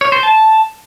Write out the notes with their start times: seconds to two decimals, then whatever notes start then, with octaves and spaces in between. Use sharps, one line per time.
0.01 C#5
0.12 C5
0.23 A5